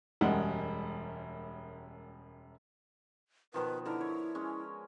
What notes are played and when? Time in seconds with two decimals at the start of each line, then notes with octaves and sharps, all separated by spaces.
0.21 E1 F#2 G3 G#3 F#5
3.54 B2 D#3 F3 B4
3.85 D3 E4 A#4
4.01 C#5
4.35 G#3 C#4